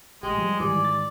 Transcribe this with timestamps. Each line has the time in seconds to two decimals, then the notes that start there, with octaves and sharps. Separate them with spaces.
0.23 A1 G#3 G4
0.38 F3 G3
0.60 G#2 D#3 E3 G3 D5 G#5
0.84 A6